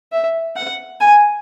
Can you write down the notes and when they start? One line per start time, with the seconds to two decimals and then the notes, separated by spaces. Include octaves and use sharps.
0.12 E5
0.56 F#5
1.00 G#5